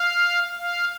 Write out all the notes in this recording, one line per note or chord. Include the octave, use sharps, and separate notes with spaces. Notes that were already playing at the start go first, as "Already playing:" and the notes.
Already playing: F5
F5